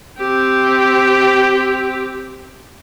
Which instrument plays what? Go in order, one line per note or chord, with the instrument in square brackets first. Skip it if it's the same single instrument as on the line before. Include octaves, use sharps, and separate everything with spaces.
[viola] C4 G4